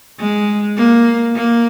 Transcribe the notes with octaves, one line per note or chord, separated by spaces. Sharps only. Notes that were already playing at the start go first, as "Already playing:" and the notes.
G#3
A#3
A#3